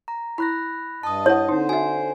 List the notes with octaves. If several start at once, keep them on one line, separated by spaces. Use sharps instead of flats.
A#5
E4 B5 F#6 A#6
G2 D#5 A5 D#6
E4 C#5 F#5
D3 C4 D#4 C5
F#4 E5 G#5